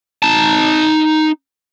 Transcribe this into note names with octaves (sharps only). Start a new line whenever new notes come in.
D#4 A5